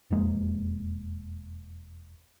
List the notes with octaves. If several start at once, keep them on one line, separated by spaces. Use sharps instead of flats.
E1 F2 G#3 A#3